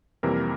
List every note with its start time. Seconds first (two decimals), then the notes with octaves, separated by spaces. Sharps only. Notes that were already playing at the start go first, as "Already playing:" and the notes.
0.23 F2 C3 E3 G3 A#3 A#4